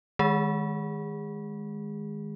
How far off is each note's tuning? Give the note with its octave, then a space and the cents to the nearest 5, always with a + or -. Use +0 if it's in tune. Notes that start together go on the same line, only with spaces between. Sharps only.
D#3 +0 G#3 +0 G#4 -25